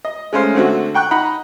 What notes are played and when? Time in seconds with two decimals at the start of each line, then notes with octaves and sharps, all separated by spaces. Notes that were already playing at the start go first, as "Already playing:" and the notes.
0.05 D#5
0.33 G#3 A3 C#4 C5 F5
0.55 D3 A3 C4 F#4
0.94 F#5 G5 C#6 F#6
1.11 D#4 D#5 F#5 B5